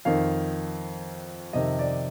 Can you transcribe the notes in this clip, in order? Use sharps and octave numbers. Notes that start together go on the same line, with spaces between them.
F2 D#3 F5
F2 C3 D#3 D#5
D5